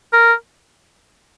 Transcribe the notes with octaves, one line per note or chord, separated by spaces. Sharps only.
A#4